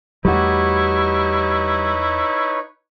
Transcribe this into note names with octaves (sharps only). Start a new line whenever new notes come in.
E2 G3 A3 D#4 E4 F#4 B4 C#5